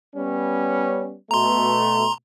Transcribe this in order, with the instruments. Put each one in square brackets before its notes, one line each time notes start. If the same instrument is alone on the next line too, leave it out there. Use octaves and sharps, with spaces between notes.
[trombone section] G3 B3 C#4
[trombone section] B2 A3 [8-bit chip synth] A#5 C6